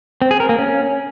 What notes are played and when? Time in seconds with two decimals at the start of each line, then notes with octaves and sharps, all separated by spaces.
0.22 C4
0.31 G#4
0.40 A#4
0.49 A#3
0.58 C#4